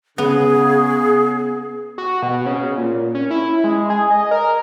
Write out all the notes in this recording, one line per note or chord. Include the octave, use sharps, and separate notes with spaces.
C#3 B3 G#4
F#4
B2
C#3
A#2
C#4
E4
G#3
G#4
D#5
A#4